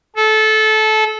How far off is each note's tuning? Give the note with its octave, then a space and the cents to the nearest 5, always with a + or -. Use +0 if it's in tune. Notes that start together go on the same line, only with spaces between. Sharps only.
A4 -20